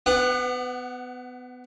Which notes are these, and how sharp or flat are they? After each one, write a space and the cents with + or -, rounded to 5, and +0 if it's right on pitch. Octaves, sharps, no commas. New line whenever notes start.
B3 +25 F#5 +0 D#6 -45